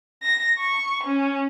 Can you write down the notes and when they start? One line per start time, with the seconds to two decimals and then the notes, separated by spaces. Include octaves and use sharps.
0.23 A#6
0.59 C#6
1.04 C#4